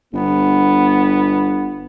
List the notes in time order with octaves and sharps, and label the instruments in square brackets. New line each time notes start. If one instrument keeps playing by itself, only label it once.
[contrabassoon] G1 [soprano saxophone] B3